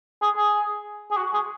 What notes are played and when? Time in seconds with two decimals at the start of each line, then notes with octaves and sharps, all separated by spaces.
0.22 G#4
0.37 G#4
1.11 G#4
1.17 F#4
1.34 G#4